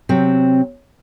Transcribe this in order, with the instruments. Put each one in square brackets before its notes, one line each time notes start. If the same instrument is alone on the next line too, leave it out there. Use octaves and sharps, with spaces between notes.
[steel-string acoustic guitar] C3 F#3 C4